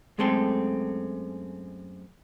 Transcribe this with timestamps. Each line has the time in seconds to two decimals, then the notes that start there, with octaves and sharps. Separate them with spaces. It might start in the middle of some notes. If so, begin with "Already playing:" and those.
0.18 F#2 G#3 A3 C4 A4 C6